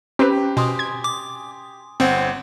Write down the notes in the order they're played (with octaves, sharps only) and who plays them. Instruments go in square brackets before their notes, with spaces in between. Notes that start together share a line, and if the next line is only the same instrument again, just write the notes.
[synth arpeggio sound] C4 B4 [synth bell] C#4 [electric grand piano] G4
[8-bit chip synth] B2 [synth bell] G#5 C6 D#6
[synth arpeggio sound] G#6
[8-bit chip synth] D6
[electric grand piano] G1 C5 F#5 [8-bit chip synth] C4